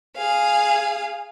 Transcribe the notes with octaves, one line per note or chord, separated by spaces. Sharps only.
G#4 F5